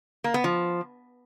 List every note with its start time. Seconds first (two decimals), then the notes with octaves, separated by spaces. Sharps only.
0.24 A#3
0.34 B3
0.44 F3